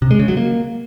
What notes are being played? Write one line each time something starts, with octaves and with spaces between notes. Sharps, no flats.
C3
G#3
C#3
F#3
A#3